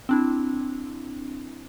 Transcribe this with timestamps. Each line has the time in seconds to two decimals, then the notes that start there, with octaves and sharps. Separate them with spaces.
0.09 C4 D4 E4